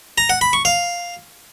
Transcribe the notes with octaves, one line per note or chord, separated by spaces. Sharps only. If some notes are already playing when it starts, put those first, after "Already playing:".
A#5
F#5
B5
C#6
F5